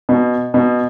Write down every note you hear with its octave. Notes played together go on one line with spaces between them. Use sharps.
B2
B2